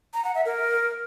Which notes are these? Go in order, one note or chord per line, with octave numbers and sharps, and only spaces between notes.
A#5
F#5
E5
A#4